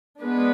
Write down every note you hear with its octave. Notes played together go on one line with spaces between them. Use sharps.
G#3 B3 D4 B4